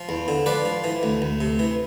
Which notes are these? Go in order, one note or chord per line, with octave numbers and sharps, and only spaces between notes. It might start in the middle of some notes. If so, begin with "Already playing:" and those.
Already playing: F3
E2
D3
F3 B4 D5
F3
E3
D2
D2
C3
E3